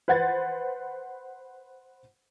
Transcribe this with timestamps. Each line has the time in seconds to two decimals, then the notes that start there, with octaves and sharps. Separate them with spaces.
0.08 B4 C5 F#5 G#6 A6